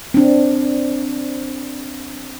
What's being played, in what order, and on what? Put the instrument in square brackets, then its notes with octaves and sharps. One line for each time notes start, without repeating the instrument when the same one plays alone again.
[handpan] C4 D4